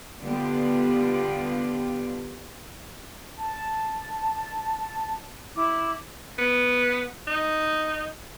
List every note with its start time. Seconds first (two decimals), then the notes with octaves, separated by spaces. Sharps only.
0.21 D3 G3 B3 D4 F4 G4
3.37 A5
5.55 E4 D6
6.38 B3
7.27 D#4